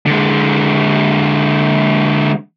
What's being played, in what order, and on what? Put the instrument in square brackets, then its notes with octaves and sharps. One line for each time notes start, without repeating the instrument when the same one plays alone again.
[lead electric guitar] D3 G#3